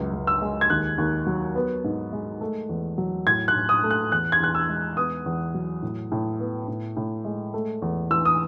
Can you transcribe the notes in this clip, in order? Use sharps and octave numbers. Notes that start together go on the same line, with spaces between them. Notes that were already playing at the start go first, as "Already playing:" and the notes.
Already playing: C#2 F#2 F#3
C#2
E6
G#3
G#6
D#2 F#6
D#2
F#3
B3
G#2
G#3
A3
E2
F#3
A2 G#6
F#6
A2
D#6
A3
F#6
E2 F#6
G#6
E2 F#6
E6
G#3
B3 D#6
E2
F#3
A2
A2
B3
A2
A2
G#3
A3
E2
E3 E6
D#6